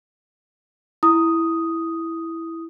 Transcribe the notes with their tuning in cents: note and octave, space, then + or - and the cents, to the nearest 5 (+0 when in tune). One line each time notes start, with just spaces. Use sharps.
E4 +0 D#6 +0